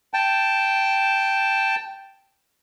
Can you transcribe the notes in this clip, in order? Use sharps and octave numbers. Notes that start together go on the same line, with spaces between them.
G5 A5